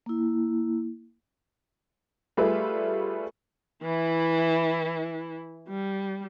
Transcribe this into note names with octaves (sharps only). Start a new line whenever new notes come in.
A#3 E4
G3 A3 F4 G#4 B4 E5
E3 E4
G3